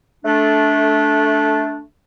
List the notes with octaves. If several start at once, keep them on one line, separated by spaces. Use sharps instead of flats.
A3 D4